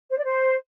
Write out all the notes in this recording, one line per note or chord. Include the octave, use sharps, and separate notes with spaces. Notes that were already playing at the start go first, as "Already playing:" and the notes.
C5
D5
C5